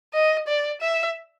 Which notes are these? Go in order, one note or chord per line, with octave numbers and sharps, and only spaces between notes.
D#5
D5
E5